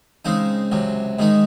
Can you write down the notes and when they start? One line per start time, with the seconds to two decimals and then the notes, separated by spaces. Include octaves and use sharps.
0.25 C#3 G#3 C4 D#4
0.72 C#2 C3 F#3
1.19 G#2 D#3 G#3 D#4